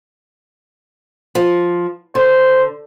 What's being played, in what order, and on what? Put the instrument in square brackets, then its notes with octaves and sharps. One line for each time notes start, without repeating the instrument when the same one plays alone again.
[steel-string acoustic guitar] F3
[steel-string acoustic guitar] D3 [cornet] C5